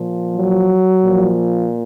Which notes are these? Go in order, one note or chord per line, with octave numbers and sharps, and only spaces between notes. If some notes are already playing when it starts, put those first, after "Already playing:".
Already playing: A#2 F3
F#3
A#2 F3